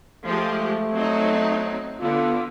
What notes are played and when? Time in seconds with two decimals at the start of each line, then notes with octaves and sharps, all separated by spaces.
0.25 F3 G#3 A3 G4
0.94 F#3 C4 D#4
2.00 D3 B3 F4